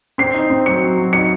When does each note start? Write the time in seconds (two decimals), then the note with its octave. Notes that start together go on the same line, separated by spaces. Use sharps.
0.18 C4 C7
0.34 D#4
0.50 C4
0.66 F#3 C#7
0.82 F#3
0.97 F#3
1.13 D#4 C#7